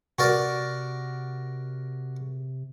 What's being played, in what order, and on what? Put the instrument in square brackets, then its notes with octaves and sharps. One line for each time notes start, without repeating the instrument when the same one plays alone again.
[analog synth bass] C3 [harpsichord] F#4 A#4 D5